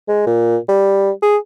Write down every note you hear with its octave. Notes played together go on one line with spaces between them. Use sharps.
G#3
A#2
G3
G#4